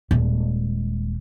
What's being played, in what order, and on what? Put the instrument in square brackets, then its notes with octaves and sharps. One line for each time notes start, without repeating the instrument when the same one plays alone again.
[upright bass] D#1 G#3